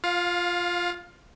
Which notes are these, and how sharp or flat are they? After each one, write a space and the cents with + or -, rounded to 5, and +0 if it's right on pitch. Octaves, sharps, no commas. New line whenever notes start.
F4 +0 F5 +25